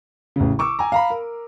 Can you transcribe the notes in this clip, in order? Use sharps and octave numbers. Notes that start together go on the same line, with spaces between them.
A1 C#3
C#6 D6 E6
G#5 A#5
F5 A#5 B5
A#4